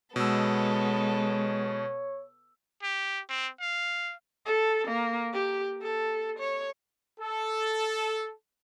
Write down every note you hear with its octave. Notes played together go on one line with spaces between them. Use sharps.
B2 G#3 B3 A4 C#5 E6
G4
C4
F5
A4
A#3
G4
A4
C#5
A4